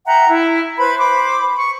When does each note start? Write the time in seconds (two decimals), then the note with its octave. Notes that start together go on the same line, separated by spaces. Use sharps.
0.06 E5 F#5 G5 A#5
0.29 E4
0.77 B4 C5 B5
0.98 C5 B5 D6
1.55 C#6